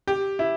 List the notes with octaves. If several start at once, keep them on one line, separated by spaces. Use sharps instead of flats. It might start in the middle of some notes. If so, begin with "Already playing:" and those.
G4
E4